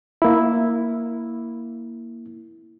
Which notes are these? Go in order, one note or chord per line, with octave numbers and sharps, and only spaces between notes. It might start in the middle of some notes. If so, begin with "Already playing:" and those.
A#3 E4